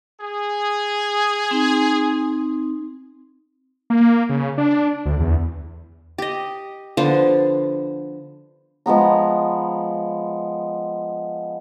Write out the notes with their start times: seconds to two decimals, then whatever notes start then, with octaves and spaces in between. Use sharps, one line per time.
0.21 G#4
1.51 C4 D#4
3.90 A#3
4.29 C#3
4.58 D4
5.06 D2
5.20 E2
6.18 G4 D#5
6.97 D3 F3 B3 C5
8.86 F3 G#3 B3 A#5